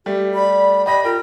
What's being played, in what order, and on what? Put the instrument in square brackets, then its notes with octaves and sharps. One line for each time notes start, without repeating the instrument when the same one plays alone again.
[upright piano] G3 A3 [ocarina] G4
[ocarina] D5 [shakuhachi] B5
[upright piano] G4 D#5 A#6 [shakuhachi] B5
[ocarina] F4 [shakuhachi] A#4 [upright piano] G5